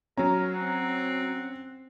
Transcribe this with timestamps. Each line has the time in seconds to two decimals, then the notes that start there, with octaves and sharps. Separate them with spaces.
0.18 F#3 C#4 A#4 A#5
0.53 C4 F#5